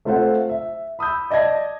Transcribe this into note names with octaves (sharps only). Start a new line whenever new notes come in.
A3 C4 F4 A4 C5 F#5
E5
B5 D#6 E6 G6
D5 D#5 A5 G#6 A#6